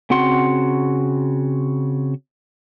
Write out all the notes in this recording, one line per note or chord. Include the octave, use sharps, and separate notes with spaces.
C#3 C4 F#4 F#5 C6